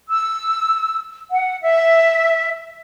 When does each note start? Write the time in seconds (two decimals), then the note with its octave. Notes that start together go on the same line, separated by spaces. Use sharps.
0.10 E6
1.30 F#5
1.62 E5